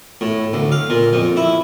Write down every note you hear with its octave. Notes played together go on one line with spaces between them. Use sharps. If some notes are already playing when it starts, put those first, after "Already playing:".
A2
D2
F5
A#2
F2
E4